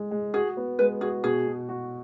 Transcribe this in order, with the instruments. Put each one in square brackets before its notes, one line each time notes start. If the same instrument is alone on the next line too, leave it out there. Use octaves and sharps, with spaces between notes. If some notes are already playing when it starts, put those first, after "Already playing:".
Already playing: [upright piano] G#3
G#3
[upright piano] F#4 [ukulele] G#4
[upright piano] B3
[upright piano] G#3 [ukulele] B4
[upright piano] F#4 [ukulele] G#4
[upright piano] B2 [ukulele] G#4
[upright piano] B2
F#4